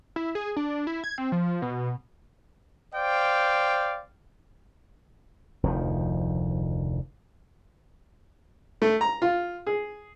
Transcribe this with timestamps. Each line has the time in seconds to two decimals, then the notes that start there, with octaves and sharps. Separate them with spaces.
0.16 E4
0.35 G#4
0.56 D4
0.87 E4
1.04 G#6
1.18 C4
1.32 F3
1.62 B2
2.94 C5 D5 F5 G5
5.63 F1 D2 D#3 F3
8.82 A3
9.01 A#5
9.22 F4
9.67 G#4